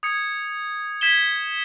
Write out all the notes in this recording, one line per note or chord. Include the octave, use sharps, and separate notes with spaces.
D#6 G#6 C#7
G#6 B6 E7 G7